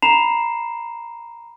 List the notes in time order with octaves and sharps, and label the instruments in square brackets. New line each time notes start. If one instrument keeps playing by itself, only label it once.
[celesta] A#5 B5 C7 E7 F7